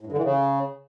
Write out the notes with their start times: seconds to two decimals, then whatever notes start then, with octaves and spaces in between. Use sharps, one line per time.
0.01 A2
0.07 G2
0.12 D3
0.18 E3
0.23 C#3